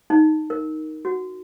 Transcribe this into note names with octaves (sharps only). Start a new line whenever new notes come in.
D#4
A#4
F#4